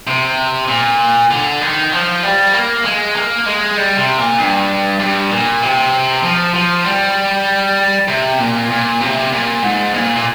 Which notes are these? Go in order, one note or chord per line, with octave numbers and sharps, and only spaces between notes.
C3
A#2
D3
D#3
F3
G3
A#3
G#3
A#3
G#3
G3
C3
A#2
G2
G2
A#2
C3
F3
F3
G3
C3
A#2
A#2
C3
A#2
G#2
A#2
A#2